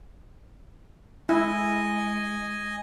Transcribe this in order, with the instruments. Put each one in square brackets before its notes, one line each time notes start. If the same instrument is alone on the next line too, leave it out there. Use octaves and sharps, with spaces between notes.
[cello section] G#3 [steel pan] E4 [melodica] D#5 G#5